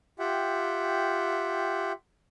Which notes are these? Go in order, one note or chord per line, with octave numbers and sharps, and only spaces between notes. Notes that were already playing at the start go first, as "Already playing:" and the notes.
F4 G4 E5 F#5 G5